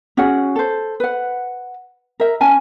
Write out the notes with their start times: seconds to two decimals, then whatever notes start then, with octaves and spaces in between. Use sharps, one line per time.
0.17 C#4 F#4 G#4 F#5
0.56 A4 C5
1.00 B4 F#5
2.20 A#4 E5
2.41 C#4 G#5 A5